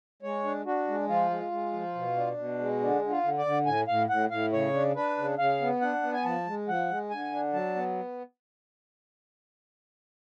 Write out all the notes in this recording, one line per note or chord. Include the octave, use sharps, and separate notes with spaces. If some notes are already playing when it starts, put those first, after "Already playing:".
G#3 C#5
D4
D4 F#4
G#3
F3 F4
G#3
G#3
F3
B2
D4
B2
G#3
D3 D4
D3
F4
D3
D5
D3
A2 G#5
A2 F5
A2 F#5
A2 F5
C#3 C#5
D4
D4 B4
C#3
C#3 F5
B3
D4 F#5
B3
G#5
F3 A5
G#3
F3 F#5
G#3
D3 G#5
D4
F#3 A5
B3